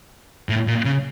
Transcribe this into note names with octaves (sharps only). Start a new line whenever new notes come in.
A2
A#2
C#3